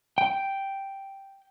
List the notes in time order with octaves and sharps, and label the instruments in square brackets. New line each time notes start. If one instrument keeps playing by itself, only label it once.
[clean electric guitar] G5